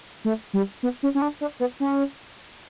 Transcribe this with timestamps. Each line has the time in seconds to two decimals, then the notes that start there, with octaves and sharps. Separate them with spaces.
0.25 A3
0.53 G3
0.83 B3
1.03 C#4
1.15 C#4
1.22 D4
1.41 D4
1.60 B3
1.80 C#4